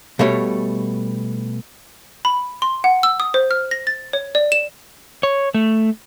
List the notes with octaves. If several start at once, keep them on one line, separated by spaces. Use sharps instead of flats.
B2 G3 A3 C#5
B5
C6
F#5
E6
D#6
C5
F6
A#6
A6
C#5
D5
E7
C#5
A3